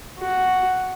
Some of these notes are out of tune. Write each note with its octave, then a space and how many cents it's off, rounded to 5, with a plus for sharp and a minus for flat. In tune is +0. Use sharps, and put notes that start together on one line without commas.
F#4 +0